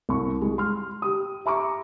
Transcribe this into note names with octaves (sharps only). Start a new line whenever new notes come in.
C2 C#6
G#3
C6 F6
G4 D#6
E5 A#5 C#6 D6